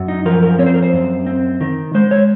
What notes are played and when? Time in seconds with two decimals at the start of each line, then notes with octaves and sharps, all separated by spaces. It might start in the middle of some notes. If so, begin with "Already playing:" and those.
Already playing: F#2
0.08 D#4
0.26 F3 A#4
0.43 A#4
0.59 C4 C#5
0.66 C5
0.74 A#4
0.83 C5
0.93 F#2
1.26 C4
1.61 D#3
1.95 G#3 C5
2.11 C#5